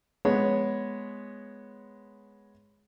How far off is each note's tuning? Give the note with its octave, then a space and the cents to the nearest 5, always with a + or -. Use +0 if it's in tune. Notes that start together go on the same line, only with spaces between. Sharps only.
G#3 +0 B3 +0 C#5 +0